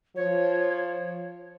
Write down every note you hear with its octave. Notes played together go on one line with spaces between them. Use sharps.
F3 C#5